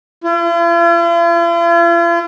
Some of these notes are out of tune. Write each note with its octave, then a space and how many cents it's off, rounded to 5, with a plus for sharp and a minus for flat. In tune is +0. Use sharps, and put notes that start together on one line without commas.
F4 -45